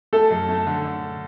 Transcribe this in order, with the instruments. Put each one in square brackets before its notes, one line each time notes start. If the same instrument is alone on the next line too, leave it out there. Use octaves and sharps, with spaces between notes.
[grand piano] A3 [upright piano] A4
[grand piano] F#2
A3
D3
D3